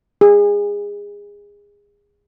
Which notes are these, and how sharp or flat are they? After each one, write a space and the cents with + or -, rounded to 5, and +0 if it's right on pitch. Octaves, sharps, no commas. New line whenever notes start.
G#4 -25